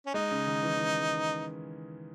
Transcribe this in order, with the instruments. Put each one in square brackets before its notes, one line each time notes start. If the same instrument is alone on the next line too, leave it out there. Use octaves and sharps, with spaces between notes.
[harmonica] C#4
[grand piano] G#3 [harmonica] D#4
[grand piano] C#3
D#3
E3
E3
G#3